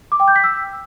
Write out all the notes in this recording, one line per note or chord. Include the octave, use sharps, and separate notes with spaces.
D6
G5
G6
B6
E6